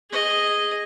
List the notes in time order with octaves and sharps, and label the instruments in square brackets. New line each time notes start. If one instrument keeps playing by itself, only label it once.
[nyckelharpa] G#4 D#5